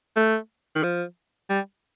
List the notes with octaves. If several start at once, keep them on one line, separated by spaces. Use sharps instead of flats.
A3
D#3
F3
G3